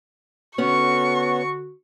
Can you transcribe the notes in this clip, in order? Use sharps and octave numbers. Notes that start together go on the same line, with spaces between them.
D3 B3 C#4 F#4 C#6